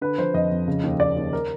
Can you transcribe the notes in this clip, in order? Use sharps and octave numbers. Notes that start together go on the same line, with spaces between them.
D3 B4
F3 C5
F2 D#5
F2
C#3
D#2
D#2 D5
D#2
A#4